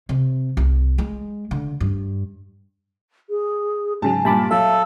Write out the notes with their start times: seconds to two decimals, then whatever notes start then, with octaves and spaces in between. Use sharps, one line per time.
0.09 C3
0.57 C2
0.98 G#3
1.51 D3
1.80 G2
3.30 G#4
4.02 G#2 C#3 F#3 G#5 A5
4.25 G2 A#2 A5 B5 D6
4.51 F#3 A4 E5 F5